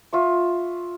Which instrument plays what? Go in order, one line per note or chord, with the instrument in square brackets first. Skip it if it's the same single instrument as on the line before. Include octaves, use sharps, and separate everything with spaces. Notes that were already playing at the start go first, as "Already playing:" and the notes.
[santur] F4 E5 C#6